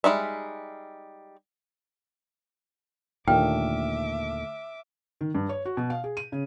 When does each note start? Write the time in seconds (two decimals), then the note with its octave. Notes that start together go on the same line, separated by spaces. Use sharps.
0.04 G3 G#3 D#4 E5
3.28 D#2 A#2 D3 A3 E5 G5 D6 F6
5.21 D#3
5.35 G2
5.49 C#5
5.65 F#4
5.77 B2
5.90 F5
6.04 G#4
6.17 D#7
6.32 C#3